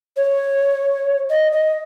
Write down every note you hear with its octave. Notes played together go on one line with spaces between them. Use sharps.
C#5
D#5
D#5